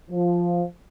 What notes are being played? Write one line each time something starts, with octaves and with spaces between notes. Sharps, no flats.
F3